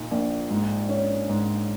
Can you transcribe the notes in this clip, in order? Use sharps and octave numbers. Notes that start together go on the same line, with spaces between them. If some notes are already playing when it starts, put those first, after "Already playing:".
Already playing: A#2 D#4
A#1
G#2
C#4
G#2